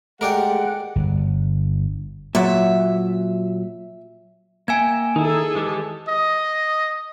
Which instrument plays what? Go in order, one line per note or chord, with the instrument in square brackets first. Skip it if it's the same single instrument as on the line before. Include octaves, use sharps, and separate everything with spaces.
[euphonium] G#3 [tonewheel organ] A3 G4 A4 [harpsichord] A#4 D5 G5 [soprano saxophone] F#5
[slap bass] G1
[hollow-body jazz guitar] A#2 F#3 [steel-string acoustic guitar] E5
[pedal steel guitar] A#3 E5 G5 [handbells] G#5 G#6
[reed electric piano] D#3 [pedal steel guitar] D#4 E4 [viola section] G#4 A4
[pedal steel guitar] E3 G#3 G4
[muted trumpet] D#5